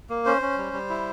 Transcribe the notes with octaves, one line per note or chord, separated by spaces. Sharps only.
A#3
C#4 C5
C#4
G3
G3
E4